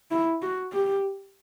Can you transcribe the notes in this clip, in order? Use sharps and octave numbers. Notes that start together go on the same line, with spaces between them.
E4
F#4
G4